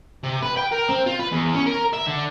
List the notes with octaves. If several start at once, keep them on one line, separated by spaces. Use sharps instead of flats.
C3
B4
G5
A#4
C4
F4
B4
E2
C#4
A#4
E5
D3